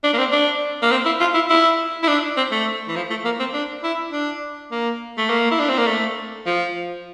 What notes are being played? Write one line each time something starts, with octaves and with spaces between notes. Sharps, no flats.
D4
A#3
C4
D4
A#3
C4
E4
F4
E4
E4
E4
D4
C4
A3
E3
F3
A3
A#3
C4
D4
E4
D4
A#3
A3
A#3
E4
D4
C4
A#3
A3
F3